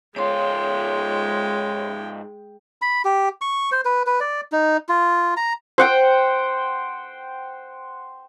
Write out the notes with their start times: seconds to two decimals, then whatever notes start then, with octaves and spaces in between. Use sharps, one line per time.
0.16 G#2 G#3 F4 C#5 G5 C6
2.82 B5
3.05 G4
3.41 C#6
3.72 C5
3.85 B4
4.07 B4
4.20 D5
4.52 D#4
4.89 F4
5.37 A#5
5.78 C5 F#5 G5